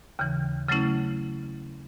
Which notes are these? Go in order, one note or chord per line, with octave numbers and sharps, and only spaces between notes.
D#2 C#3 E3
C#3 F#3 A3 C#4 E4